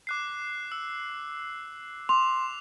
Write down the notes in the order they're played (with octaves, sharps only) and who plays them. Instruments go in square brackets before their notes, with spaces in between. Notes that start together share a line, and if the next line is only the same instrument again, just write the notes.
[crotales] D6 F#6 C7
E6
[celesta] C6 [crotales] D6 F7